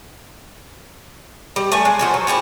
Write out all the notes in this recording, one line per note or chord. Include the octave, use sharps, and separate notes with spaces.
G3
A3 E5 G#5
G#3
F3 F#4 C5
F#3
E4 F4 G4 G#4